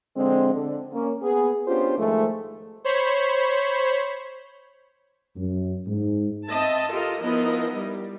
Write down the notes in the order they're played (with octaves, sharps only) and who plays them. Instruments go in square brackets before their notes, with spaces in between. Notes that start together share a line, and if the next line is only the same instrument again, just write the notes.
[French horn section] D3 F3 G#3 C4
D3
A#3 C#4
B3 G#4
B3 C#4 D4 F4 G4 C5
G#2 D#3 F3 G#3 A3
[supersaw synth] C5 C#5 B5
[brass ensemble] F#2
G#2
[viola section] C4 D#5 E5 A5
F4 G4 A4 A#4 D#5
F3 B3 D#4 E4 A#4 D#5
G3